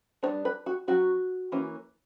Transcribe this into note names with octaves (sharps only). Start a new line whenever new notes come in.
G3 B3 D4 C#5
B4
F#4
F#3 C#4 F#4
E3 A#3 C#4